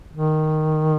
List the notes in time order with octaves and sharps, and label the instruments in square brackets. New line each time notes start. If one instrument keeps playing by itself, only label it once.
[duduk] D#3